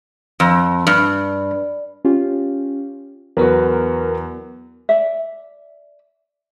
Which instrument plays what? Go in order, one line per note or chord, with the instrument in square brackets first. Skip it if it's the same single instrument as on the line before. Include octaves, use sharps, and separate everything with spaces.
[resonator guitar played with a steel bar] F2
G2
[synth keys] C#4 F4 G4
[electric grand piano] E2 [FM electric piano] F#3 B3 [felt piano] F#4 B4 [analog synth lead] A#4
[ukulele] D5 E5